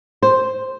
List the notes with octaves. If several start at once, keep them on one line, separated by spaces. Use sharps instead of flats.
C5